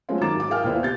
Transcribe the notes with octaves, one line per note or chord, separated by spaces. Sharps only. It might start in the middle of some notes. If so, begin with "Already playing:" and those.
F#3 G#3 A3 C4 C#4 F4
D#3 F#3 A#5 D6 A6 E7
G#2 D6
G#4 A#4 F5 G5 F6
D#1 A#2 B3 E4 C5 F5
C3 G4 G6 A6